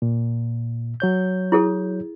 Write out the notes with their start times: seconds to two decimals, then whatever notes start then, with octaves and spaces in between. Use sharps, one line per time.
0.02 A#2
1.00 F#3 C#5 G6
1.52 E4 G#4 A4